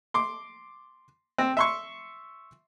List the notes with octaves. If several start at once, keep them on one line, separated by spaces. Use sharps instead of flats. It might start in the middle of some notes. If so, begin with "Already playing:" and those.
C6 D6
C4
E5 C6 C#6